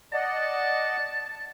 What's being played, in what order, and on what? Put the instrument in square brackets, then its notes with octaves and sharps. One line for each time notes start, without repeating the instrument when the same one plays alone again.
[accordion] D5 D#5 F#5 [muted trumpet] A5